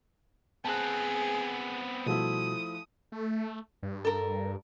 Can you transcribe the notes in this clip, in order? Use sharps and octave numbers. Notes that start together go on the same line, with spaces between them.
B3 C4 G#4 A5 F#6
B2 F3 G3 A3 E4 F#4 D#6
A3
G2
A4 A#4